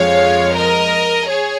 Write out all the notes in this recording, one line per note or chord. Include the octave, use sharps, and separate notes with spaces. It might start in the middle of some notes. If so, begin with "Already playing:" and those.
Already playing: F2 F3 G#3 C#5 F5
A#4 D#5
G#4 C#5